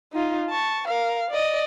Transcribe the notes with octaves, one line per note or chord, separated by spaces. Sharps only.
D#4 F4
A5 C#6
A#4 F5
D5 D#5